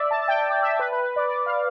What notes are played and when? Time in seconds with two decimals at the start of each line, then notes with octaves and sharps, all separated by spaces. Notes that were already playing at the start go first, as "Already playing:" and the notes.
Already playing: D5 E5
0.11 A5
0.22 A5
0.28 G5
0.50 D5
0.63 E5
0.79 B4
0.92 B4
1.04 B4
1.16 D5
1.29 D5
1.46 F5